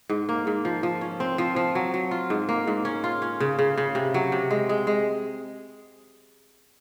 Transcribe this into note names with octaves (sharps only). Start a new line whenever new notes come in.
G#2
A#3
G#2
F3
F3
C#4
C4
F3
F3
F#3
F#3
F4
G#2
A#3
G#2
C#4
F4
C#4
C#3
C#3
C#3
C3
F#3
C3
G#3
G#3
G#3